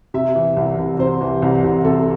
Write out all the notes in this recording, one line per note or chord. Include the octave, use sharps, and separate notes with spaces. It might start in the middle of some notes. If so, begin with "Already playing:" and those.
C3 E5
E3
C2
C2
C3 C5
E3
C2
C2
C3 A4